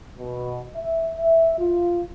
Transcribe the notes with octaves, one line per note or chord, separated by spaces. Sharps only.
B2
E5
E5
F4